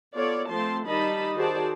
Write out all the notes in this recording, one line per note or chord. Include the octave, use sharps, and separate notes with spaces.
B3 F4 A4 C#5 D5
F3 A3 C4 A5 C6
D#3 G3 D#4 D#5 A5 B5
D#3 F#4 G#4 C5 D5 A5